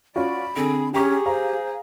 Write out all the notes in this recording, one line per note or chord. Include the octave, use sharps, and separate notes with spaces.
C#4 F4 F#4 D5 B5
D3 C4 G#4
C#4 G4 G#4 G5 A#5 C#6
C5 F5 A#5